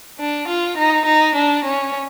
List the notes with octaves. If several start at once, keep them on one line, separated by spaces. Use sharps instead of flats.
D4
F4
D#4
D#4
D4
C#4